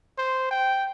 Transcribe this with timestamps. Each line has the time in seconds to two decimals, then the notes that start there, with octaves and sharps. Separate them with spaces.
0.18 C5
0.51 G5